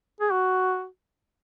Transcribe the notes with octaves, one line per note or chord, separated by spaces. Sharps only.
G#4
F#4